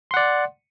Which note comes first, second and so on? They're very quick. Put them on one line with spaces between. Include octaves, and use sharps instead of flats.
C6 F#5 D5